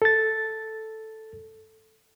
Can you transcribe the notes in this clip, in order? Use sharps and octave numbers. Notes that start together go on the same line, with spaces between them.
A4 A6